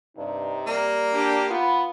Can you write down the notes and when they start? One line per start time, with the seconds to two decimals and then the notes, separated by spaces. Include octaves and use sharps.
0.17 G2 C3 D#4
0.67 G3 A#3
1.14 D4 G4
1.50 B3 F4 B5